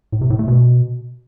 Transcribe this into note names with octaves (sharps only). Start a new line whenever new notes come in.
A2
C3
A2
A3
B2